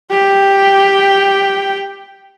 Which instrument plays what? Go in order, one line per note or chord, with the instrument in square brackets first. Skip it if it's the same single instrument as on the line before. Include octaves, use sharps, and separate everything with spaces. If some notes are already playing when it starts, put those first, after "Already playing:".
[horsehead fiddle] G4 G5